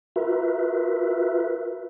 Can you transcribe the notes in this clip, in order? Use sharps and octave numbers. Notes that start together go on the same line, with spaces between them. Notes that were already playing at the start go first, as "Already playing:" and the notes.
F4 F#4 A#4 B4 E5